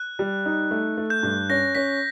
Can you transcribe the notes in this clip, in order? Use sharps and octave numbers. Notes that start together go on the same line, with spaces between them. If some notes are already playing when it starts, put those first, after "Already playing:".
Already playing: F#6
G3
D#4
A3
A3
G6
G2
C#4 A#6
C#4 B6